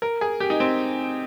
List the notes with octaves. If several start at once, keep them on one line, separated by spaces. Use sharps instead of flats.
A#4
G#4
G4
D#4
C4